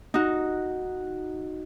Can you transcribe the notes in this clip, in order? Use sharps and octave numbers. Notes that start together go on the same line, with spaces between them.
D#4 F#4